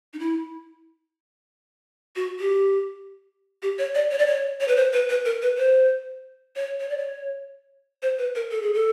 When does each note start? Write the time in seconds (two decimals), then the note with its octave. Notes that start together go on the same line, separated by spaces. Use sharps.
0.14 D#4
0.19 E4
2.16 F#4
2.40 G4
3.62 G4
3.78 C#5
3.95 D5
4.11 C#5
4.18 D5
4.26 C#5
4.60 C#5
4.68 B4
4.76 C5
4.93 B4
5.09 B4
5.25 A#4
5.42 B4
5.58 C5
6.56 C#5
6.80 C#5
6.89 D5
6.98 C#5
8.02 C5
8.18 B4
8.35 A#4
8.51 A4
8.62 G#4
8.74 A4